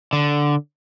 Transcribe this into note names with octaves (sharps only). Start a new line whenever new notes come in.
D3